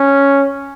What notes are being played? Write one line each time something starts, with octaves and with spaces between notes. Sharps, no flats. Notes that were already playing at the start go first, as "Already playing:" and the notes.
Already playing: C#4